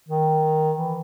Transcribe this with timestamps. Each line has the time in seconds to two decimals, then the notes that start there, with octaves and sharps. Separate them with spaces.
0.08 D#3
0.78 E3